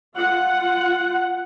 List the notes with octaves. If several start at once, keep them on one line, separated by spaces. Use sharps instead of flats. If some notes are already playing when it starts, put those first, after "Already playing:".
F4 F#5